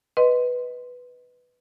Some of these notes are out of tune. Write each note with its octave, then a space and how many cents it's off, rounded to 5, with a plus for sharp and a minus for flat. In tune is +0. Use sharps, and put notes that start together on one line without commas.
B4 +0 D#5 +0 C6 -10